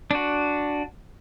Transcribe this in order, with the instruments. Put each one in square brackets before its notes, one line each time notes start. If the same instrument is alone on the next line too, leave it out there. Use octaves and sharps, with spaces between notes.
[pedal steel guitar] D4 F#4